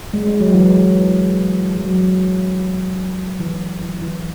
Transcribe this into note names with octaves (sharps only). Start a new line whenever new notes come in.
G#3
G#3
F#3
E3
F#3
E3
E3
E3